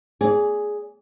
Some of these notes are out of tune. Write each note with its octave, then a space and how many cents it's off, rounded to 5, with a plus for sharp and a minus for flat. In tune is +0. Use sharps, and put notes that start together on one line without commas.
G#4 +0 D5 -25